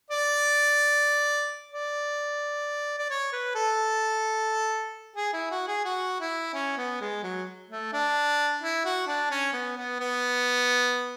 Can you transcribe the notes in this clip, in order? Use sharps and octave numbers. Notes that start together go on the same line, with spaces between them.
D5
D5
D5
C#5
B4
A4
G#4
E4
F#4
G#4
F#4
E4
C#4
B3
G#3
F#3
A3
D4
E4
F#4
D4
C#4
B3
B3
B3